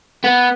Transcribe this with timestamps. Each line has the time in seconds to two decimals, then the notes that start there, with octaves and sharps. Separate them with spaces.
0.24 B3